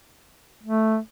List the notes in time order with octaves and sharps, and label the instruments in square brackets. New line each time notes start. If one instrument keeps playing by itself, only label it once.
[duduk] A3